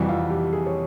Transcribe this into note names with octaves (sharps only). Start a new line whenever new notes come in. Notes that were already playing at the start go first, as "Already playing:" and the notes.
Already playing: F2 C3 E3 G3 F#4
F4
G4
G#4
C#5